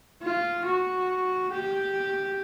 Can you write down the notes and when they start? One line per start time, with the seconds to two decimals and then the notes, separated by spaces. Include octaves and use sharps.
0.22 F4
0.65 F#4
1.51 G4